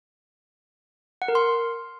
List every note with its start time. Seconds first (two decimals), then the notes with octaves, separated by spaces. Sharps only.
1.22 F#5
1.28 A#4
1.35 C6